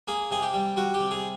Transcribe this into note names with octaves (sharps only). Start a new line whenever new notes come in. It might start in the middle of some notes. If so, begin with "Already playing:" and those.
A#3 G#4
C3 G#4
G4
G3
G3 F#4
G4
C3
G#4